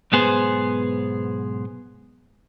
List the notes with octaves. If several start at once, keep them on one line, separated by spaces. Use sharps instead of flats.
B1 G#2 B3 G#4 C5